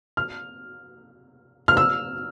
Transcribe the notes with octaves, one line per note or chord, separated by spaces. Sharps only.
F6
F6
E6